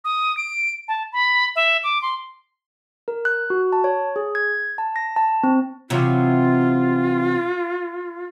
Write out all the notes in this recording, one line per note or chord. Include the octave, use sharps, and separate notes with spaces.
D#6
D7
A5
B5
E5
D6
C6
A#4
F#6
F#4
A5
C#5
G#4
G#6
A5
A#6
A5
C4
C3 E3 F#3 F4